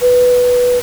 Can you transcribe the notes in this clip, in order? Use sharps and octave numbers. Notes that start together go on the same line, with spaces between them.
B4